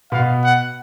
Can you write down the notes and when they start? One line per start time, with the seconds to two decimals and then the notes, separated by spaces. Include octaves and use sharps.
0.12 B2 B3 F5
0.44 F#5